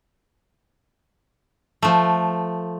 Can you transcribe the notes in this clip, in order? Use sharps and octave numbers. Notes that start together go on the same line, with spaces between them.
F3 A3